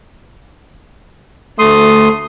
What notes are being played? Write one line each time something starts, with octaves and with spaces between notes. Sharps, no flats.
D2 A3 C6 D#6